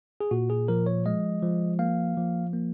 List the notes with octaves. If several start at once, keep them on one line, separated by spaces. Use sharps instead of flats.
G#4
A#2 F#4
G#4
F3 A#4
C#5
G#3 D#5
F3
A#3 F5
F3
A#3